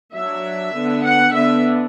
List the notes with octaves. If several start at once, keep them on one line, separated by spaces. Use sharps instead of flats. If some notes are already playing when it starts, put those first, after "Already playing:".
F#3 D4 E5
D3 B3 D4
F#5
D3 B3 D4 E5